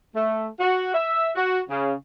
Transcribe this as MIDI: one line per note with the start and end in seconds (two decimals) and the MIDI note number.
0.15 0.47 57
0.60 0.90 66
0.94 1.30 76
1.36 1.61 66
1.69 1.93 49